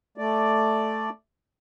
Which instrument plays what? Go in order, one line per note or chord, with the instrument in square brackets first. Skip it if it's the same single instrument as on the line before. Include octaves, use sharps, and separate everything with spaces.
[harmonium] A3 D5